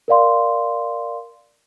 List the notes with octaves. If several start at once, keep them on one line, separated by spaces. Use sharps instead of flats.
A#4 D5 F5 C6